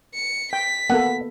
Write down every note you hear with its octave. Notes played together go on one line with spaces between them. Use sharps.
C#7
G5 B6
A#3 B3 A4 F#5